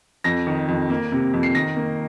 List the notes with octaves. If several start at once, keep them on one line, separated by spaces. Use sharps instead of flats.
F2 A#6
D#3
F2
A#3
C3
F2
C7
D#3 A#6
A#3